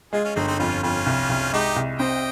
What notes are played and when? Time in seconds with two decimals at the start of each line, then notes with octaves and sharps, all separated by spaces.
0.13 G#3 F4 G#4
0.24 C#4 F4
0.36 G1 C4 D#4
0.47 C4 D#4
0.59 F2 C#4 F4
0.83 F2 C#4 F4
1.06 C2
1.29 C2
1.53 G#3 D#4 G4
1.76 C2
1.99 C4 D#5 G5